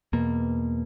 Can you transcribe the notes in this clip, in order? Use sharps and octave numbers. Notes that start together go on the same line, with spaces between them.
E2 B2 A#3